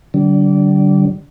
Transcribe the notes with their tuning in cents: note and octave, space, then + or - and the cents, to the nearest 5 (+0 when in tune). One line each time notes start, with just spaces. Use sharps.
D3 +0 G3 -40 D4 -25